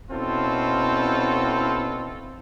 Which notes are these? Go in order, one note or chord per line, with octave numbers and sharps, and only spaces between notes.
B2 C4 C#4 E4 F4 A4